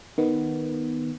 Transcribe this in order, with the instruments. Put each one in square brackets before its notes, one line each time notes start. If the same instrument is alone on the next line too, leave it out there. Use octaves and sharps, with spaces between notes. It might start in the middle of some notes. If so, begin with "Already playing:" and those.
[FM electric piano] D#3 B3